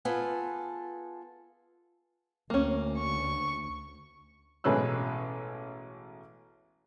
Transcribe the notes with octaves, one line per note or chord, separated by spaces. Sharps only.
B3 F4 G#4 A4
D2 A#3 C#4
C#6
A1 B2 G#3 C#4 B4 E6